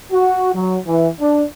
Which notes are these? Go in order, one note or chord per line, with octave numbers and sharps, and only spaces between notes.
F#4
F#3
E3
D4